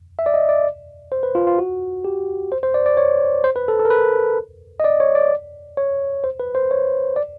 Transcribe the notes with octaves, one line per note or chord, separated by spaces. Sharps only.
E5
D5
D#5
D5
C5
B4
F4
F4
F#4
G4
C5
C5
D5
D5
C#5
C5
B4
A4
A4
A#4
B4
D#5
D5
C#5
D5
C#5
C5
B4
C5
C#5
D5